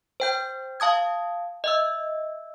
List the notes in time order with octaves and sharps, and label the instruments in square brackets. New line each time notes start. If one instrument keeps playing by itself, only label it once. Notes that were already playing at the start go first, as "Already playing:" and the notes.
[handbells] C5 G5 G6
F5 A5 D#6 G#6
D#5 E5 E6